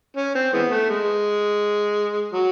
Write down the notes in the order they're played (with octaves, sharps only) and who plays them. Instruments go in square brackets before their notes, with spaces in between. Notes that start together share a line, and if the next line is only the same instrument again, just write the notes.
[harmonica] C#4
C4
E3 G#3 B3
A3
G#3
F#3